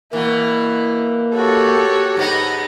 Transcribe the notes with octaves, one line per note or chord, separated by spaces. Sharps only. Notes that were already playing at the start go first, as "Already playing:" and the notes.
B2 E3 A#3 E4
F#4 G4 A4 C#5
G#2 B3 D#4 A#5